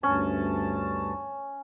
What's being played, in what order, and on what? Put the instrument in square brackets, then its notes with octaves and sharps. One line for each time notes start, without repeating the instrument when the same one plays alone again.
[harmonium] D2 G2 A5 [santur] C#4